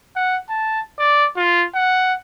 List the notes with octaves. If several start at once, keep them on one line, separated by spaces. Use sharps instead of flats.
F#5
A5
D5
F4
F#5